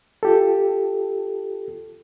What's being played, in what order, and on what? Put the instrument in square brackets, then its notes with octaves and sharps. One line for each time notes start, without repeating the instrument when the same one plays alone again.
[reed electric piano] F4 G4 A4